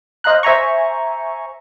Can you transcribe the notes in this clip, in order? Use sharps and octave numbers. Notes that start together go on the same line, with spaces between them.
C5 D#5 F5 A#5 F#6
C5 E5 G#5 A#5 C#6